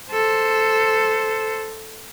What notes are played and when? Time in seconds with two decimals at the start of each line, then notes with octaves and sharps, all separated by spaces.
0.11 A4 C5